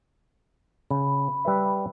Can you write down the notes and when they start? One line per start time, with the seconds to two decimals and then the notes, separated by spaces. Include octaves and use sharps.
0.91 C#3 B5
1.45 G3 B4 E5